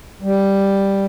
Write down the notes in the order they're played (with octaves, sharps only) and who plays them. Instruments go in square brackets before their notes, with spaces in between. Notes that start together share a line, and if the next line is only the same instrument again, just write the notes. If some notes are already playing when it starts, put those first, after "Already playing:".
[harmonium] G3